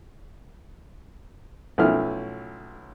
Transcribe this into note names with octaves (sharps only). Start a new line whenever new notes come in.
B1 F3 A3 C#4 E4 F6